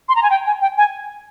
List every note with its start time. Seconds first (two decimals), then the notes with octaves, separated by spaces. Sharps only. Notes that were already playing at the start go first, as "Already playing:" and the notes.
0.09 C6
0.16 A#5
0.23 G#5
0.30 G5
0.46 G#5
0.61 G5
0.78 G#5